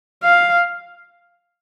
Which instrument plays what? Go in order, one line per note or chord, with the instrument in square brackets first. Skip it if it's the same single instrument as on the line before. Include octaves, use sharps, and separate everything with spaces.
[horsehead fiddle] F5